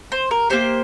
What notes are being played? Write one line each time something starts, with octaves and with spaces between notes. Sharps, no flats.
C5
A#4
A#3 D#4 G4 C5